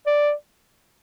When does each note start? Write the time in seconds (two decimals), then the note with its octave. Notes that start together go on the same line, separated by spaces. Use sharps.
0.07 D5